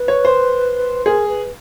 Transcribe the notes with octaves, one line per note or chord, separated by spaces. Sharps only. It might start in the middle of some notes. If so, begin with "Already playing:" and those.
Already playing: B4
C#5
C5
G#4 A#4
B4